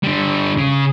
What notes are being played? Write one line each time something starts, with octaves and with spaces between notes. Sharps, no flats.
D3 G3
C#3